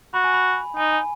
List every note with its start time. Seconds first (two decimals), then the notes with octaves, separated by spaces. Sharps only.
0.14 F#4 B5
0.24 G#5
0.34 B5
0.76 D#4 G#5
0.92 G#5